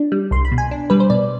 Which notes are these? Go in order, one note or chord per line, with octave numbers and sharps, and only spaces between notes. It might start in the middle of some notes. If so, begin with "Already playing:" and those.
Already playing: D4
G3
C2 C6
B5
B2
G#5
D4
G3 B4
C5
B2 D5